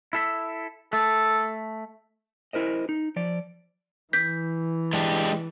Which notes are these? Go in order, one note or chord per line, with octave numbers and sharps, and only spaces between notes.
E4 A4 E5
A3 A4
E4 A#4 C5 D#5
D#4
F3 D5
E3 G6 B6
G#3 D4 G4